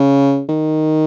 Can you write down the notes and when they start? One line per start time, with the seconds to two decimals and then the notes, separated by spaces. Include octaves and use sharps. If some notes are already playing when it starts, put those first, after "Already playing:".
Already playing: C#3
0.49 D#3